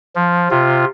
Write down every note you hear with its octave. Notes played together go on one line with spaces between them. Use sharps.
F3
C3 F4